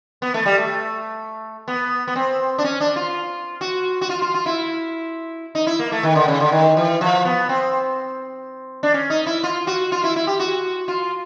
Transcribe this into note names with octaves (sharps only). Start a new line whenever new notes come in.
B3
A3
G3
A3
B3
B3
C4
D4
C#4
D4
F4
F#4
F#4
F4
F4
F4
E4
D#4
E4
A#3
A3
D#3
D3
C#3
D3
D#3
E3
F3
B3
C4
D4
C#4
D#4
E4
F4
F#4
F4
E4
E4
G4
F#4
F4